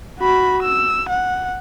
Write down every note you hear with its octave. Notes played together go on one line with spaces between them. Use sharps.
F#4 B5
E6
F#5